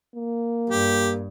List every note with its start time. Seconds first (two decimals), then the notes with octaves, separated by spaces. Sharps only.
0.16 A#3
0.70 G2 G4